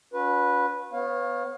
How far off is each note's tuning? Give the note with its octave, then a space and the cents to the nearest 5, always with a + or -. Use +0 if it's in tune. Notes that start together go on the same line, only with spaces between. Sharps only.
C#4 +45 F#4 -45 B4 -10
B3 +5 C#5 -20 F5 +20